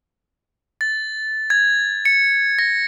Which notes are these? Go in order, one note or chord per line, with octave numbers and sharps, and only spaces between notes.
A6
G#6
C#7
A#6